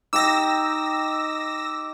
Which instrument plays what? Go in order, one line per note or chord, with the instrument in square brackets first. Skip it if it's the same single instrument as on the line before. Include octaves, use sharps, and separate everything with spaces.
[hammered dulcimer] D#4 G4 G5 [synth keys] D6 [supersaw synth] E6 A#6